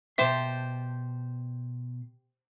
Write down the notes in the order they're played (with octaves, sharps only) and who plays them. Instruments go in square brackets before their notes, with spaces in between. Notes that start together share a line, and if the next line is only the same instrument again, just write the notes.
[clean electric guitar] B2 C6 [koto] G4 C5 A5 [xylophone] E5